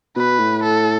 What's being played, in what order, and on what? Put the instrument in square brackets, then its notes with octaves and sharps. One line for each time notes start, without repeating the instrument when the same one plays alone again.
[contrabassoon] B2 [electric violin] B4
[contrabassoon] A2
[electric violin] A4